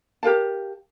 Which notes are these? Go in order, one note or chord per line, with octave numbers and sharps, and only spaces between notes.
G4 A#4 F5 A5